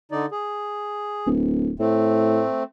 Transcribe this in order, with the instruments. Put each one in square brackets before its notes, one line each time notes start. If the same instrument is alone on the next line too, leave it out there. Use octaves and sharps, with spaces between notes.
[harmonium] D3 D#4 D5
G#4
[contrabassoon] D1
[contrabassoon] A2 [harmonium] A3 C4